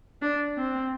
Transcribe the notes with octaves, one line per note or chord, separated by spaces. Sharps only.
D4
C4